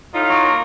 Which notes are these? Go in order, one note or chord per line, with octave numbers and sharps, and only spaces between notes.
A2 D#4 F4
F#3
A#3